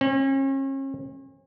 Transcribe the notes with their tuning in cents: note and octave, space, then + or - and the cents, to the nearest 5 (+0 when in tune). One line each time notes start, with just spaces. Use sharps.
C#4 -40